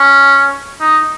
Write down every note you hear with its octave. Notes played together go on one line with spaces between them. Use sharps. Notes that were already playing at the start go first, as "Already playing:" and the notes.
Already playing: C#4
D#4